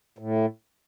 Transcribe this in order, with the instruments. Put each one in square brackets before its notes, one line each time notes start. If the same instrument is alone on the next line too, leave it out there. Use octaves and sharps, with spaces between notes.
[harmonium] A2